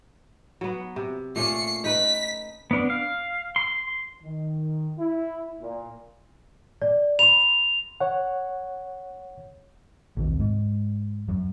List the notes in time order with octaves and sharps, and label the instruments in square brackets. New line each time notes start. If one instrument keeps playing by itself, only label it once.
[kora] F#3 B3
C3
[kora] A#2 A3 C#4 [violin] C7 C#7
[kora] D#4 B4 [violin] B6
[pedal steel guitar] B3 D4
F5
C6
[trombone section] D#3
E4
A#2
[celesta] D5
[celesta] B5 C6 [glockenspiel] F7
[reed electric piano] C#5 F#5
[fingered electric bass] A#1 D#2 C3
G#2
F#2